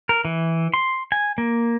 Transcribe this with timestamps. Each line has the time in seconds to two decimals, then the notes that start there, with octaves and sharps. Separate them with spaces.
0.09 A#4
0.25 E3
0.74 C6
1.12 G#5
1.38 A#3